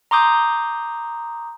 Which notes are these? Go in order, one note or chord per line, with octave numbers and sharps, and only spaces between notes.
A#5 C6 D6 D#6 G6